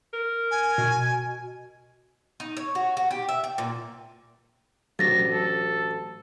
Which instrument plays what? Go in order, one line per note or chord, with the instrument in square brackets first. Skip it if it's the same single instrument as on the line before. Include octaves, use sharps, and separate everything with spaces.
[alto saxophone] A#4
[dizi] G#5
[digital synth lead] B2
[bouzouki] D#4
C#5
F#4
F#4
G4
E5
G5
A#2
[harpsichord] A1 D2 [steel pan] F#3 [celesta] A6 A#6
[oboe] A4